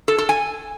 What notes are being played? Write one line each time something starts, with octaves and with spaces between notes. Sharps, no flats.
A4
A4
G#5